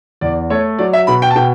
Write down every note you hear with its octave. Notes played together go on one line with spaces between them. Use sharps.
E2 D5
A3 C#5
F#3 D5
E5
B2 B5
G5
A5
B2 G5